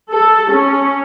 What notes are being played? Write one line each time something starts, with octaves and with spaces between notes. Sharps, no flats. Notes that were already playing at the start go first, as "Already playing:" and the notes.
A4
C#4